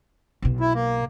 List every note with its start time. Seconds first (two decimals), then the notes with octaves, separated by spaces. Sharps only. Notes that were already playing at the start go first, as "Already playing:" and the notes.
0.42 B1 B2
0.60 E4
0.74 A#3